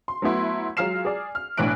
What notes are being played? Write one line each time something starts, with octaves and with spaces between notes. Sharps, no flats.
C6
F#3 A3 B3 E4 C6
F#3 G#3 F4 F6 C7 E7
G#4 D5
F6
B1 A2 E3 D4 F#6 D7